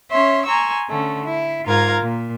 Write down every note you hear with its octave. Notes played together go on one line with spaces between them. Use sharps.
C#4 C#5 E5 C6
G#5 A#5 C6 C#6 E6
D3 A3 C#4
E4
G#2 F4 A#4 F5 A#5 G#6
A#2